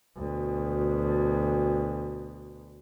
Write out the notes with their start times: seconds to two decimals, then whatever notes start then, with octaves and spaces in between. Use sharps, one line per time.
0.16 D2 B2